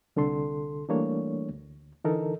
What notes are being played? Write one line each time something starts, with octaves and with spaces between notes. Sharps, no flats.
C2 D3 A4 C6
E3 G3 A3 A#3 D4 C#5
D2
D3 E3 D#4 A4 A#4